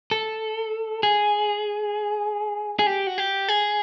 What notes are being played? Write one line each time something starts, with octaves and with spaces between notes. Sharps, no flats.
A4
G#4
G#4
G4
F#4
G4
G#4